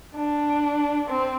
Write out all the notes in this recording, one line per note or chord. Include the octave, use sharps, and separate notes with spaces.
D4
C4